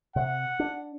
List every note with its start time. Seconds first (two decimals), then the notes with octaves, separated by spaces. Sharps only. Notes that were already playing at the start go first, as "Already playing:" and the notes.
0.16 C3 F#5
0.60 D4